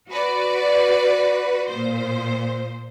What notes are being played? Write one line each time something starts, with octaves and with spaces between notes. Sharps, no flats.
F#4 B4 D5
A#2 C5